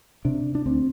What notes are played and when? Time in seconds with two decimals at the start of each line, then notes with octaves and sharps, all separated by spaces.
0.25 C3 D4
0.55 D4
0.66 D2 C4